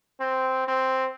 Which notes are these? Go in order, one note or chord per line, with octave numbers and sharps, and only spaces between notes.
C4
C4